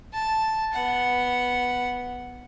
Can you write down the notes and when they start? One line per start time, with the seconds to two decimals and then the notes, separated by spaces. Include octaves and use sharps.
0.13 A5
0.73 B3 F#5